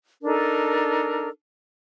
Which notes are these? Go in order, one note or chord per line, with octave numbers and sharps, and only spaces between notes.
D4 D#4 A4 A#4